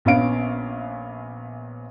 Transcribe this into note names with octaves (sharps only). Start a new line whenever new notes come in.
A#1 B3 C#4 F5 D7